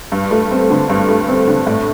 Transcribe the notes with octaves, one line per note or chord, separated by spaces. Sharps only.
G2
A3
C4
D3
G2
A3
C4
D3
A2